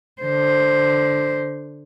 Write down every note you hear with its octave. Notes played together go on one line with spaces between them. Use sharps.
D3 C5